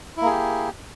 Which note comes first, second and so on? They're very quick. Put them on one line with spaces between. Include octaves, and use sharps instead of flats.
E4 A#3 G#4 G4